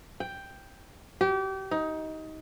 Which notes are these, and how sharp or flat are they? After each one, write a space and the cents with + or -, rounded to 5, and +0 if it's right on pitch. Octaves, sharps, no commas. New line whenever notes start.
G5 +5
G4 -30
D#4 +20